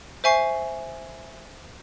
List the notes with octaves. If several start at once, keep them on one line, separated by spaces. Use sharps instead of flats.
C5 E5 G#5 C#6 C7